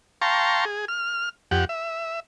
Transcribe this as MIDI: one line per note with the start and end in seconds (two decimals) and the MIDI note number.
0.22 0.65 77
0.22 0.65 79
0.22 0.65 81
0.22 0.65 82
0.22 0.65 84
0.22 0.65 85
0.65 0.85 68
0.88 1.29 89
1.51 1.65 41
1.51 1.65 67
1.51 1.65 78
1.69 2.20 76